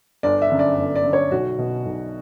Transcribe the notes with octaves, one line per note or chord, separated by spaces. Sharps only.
G1 D5
E5
F#2 D3
D5
G1
D5
F#2 D3
C#5
B1 F#4
B2
B1